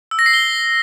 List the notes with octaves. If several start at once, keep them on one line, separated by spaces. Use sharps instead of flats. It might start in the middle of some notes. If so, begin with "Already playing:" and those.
E6
A#6
C7
G7